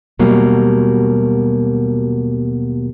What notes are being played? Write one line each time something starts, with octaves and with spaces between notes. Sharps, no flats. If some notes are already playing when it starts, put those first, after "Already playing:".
D#2 B2 F#3 G3 A#3